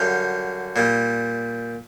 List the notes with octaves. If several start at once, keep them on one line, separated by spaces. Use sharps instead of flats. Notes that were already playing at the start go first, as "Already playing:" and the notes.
Already playing: F#2 D3 G3 F5 G5
A#2 G3